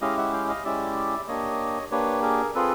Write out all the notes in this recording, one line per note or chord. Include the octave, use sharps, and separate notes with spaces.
G#3 C#4 E4 G4 D#5 F5
E5 F#5
F5 G5
D#5 F5
G#3 C#4 E4 G4 D5 E5
A#3 D4 G4 C#5 D#5
A#3 D4 G4 B4 C#5
G#4 A#4
C4 F4 G#4 A4 B4